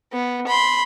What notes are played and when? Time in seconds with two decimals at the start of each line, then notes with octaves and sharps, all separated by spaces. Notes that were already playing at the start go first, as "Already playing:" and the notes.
0.13 B3
0.47 B5 C6